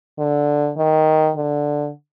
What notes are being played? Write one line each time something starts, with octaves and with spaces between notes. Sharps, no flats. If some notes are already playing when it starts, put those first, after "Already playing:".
D3
D#3
D3